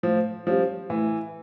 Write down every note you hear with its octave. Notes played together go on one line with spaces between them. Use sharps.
A2 F3
F3 G3 C#4 G4
A2 E3